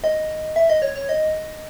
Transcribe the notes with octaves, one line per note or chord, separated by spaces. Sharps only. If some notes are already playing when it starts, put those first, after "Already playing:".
D#5
E5
D#5
C#5
C#5
D#5